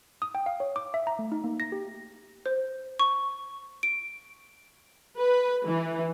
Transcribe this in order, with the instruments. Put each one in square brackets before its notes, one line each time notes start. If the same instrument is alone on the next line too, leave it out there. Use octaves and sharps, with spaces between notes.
[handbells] D#6
G5
F5
C#5
D6
E5
A#5
A3
D#4
A#3
A#6
G4
[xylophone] C5
C#6
D7
[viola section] B4
E3